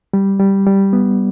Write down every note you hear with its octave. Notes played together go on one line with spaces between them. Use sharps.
G3
G3
G3
B3